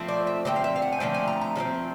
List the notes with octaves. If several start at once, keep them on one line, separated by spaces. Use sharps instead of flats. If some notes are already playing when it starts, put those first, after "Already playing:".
Already playing: F3 A3 C4
D5
E5
D3 F3 A3 C4 E5
F5
E5
F5
F#5
G#5
D3 F3 A3 C4 G5
G#5
A#5
A#5
D3 F3 A3 C4